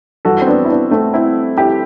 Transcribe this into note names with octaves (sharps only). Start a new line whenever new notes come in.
G2 E3 F#4 A4
C4
B3 D4
E4
B3 D4
A3 C4
C4 E4
E4 G4